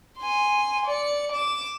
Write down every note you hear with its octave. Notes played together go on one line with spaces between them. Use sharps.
G#5 C6
D5 C#7
D6 E7